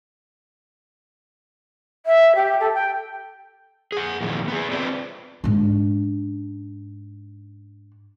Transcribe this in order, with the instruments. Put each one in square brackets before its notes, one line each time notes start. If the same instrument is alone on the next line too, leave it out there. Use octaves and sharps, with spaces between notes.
[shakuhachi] E5
G4
A4
G5
[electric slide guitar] G#4 F#5
F2 A#2 D#3 E3
B3 G#4
C4 D4 F4 B4 C5 D5
[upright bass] G#2 D4